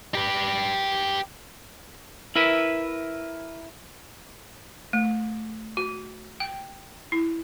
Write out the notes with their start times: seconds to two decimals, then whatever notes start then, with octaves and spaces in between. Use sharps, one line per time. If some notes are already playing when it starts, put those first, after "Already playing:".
0.15 G4 B4
2.36 E4 A#4 B4 E5
4.93 A3
5.77 F#4
6.40 G5
7.12 E4